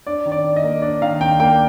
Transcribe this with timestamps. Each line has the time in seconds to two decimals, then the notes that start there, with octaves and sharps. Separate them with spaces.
0.07 D4 D5
0.26 D#3
0.32 D5
0.44 D#3
0.56 D#5
0.63 A#3
0.82 D4 D5
1.02 D#3 F5
1.21 D#3 G5
1.40 A#3 G5